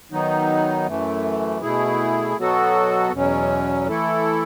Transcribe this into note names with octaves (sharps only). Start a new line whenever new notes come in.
D#3 F#3 B3 D#4
F#2 E3 A3
B2 A3 E4 G#4
B2 F#3 B3 F#4 A4
E2 B2 F#3 C#4
E3 A3 E4 A4